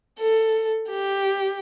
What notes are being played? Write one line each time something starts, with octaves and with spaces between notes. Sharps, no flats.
A4
G4